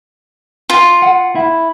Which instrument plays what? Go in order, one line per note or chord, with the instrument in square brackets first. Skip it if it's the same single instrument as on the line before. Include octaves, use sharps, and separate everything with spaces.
[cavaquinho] F4
[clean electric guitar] F#5
E4